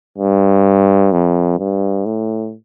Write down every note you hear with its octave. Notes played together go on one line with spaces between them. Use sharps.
G2
F2
G2
A2